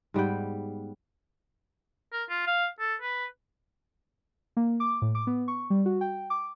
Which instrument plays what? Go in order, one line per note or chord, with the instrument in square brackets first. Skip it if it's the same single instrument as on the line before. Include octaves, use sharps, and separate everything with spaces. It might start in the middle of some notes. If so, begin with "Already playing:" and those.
[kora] G#2 G3 B3 G5
[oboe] A#4
F4
F5
A4
B4
[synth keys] A#3
D6
A2
D6
B3
C#6
G3
F#4
G5
D6